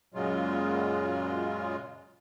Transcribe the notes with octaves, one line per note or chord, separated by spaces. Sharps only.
F#2 A#2 C#3 F#3 G#3 F4